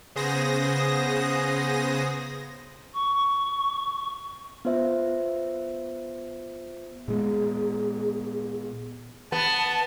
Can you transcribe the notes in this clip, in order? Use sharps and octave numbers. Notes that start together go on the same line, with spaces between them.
C#3 B3 G#4 C5 D#6 A#6
C#6
B3 F4 C5 E5
A#2 G#3 B3 G#4
B3 A5